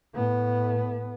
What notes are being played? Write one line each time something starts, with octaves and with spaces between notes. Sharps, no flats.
A2 B3